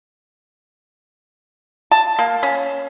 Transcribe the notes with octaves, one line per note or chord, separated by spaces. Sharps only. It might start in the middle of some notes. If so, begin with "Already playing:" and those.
A5
A#3
C#4